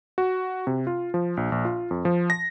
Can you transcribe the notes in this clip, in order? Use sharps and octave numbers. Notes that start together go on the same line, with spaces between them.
F#4
C3
F4
F3
A#1
A#1
F4
F2
F3
A#6